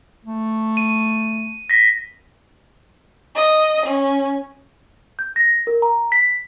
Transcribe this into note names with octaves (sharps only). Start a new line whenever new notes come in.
A3
D#7
A#6 B6
D#5
C#4
G6
A#6
A#4
A#5
B6